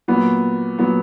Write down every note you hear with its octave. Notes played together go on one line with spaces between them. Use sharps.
A#2 F#3 B3
A#2 F#3 B3